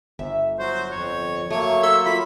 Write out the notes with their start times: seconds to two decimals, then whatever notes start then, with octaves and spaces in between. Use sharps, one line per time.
0.19 G1 E5
0.59 F#3 F#4 C5
0.91 F2 C#5
1.50 F#3 A3 A#3 C#5
1.83 A4 E5 C6 E6
2.06 F4 B5